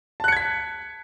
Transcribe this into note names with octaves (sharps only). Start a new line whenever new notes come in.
A5 F#6 G#6 B6 C#7